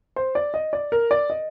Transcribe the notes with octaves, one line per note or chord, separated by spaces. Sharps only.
C5
D5
D#5
D5
A#4
D5
D#5